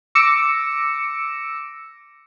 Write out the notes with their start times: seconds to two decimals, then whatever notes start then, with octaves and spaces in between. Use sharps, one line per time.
0.15 D6 E6 A#6 C#7 D7 E7